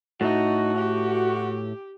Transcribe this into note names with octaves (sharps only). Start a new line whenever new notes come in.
A2 A3 D#4 F#4
G4